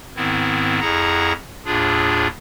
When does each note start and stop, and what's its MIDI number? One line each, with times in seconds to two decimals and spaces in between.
0.16 0.80 44
0.16 0.80 51
0.16 0.80 59
0.16 0.80 60
0.16 0.80 64
0.80 1.33 41
0.80 1.33 64
0.80 1.33 68
0.80 1.33 78
0.80 1.33 82
0.80 1.33 94
1.65 2.27 39
1.65 2.27 45
1.65 2.27 62
1.65 2.27 65
1.65 2.27 68